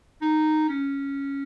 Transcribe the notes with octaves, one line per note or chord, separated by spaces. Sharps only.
D#4
C#4